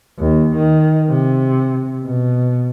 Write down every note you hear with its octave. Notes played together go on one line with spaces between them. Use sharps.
D#2
D#3
C3
B2